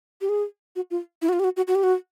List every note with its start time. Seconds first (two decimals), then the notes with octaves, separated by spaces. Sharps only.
0.21 G4
0.29 G#4
0.76 F#4
0.91 F4
1.22 E4
1.29 F#4
1.33 F4
1.40 G4
1.44 F#4
1.57 F#4
1.68 F#4
1.75 G4
1.83 F#4